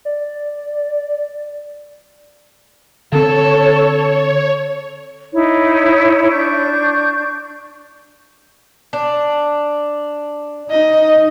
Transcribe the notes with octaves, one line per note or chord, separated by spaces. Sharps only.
D5
D3 C4 A4 C#5
D#4 E4 C#5
D4 C#6 G6
D4
D#4 D#5